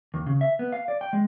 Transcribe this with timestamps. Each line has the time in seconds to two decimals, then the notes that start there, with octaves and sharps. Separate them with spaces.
0.14 D#2
0.26 C#3
0.41 E5
0.59 B3
0.72 F5
0.88 D5
1.01 G5
1.13 G#3